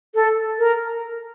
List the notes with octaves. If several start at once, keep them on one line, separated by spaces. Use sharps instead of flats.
A4
A#4